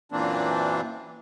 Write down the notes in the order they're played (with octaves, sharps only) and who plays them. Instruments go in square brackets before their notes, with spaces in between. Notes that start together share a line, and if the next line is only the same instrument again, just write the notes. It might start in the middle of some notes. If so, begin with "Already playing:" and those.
[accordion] F#2 A#2 E3 A#3 C4 D4